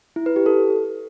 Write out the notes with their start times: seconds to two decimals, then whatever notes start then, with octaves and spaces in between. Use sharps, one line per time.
0.16 E4
0.26 B4
0.36 G4
0.46 A4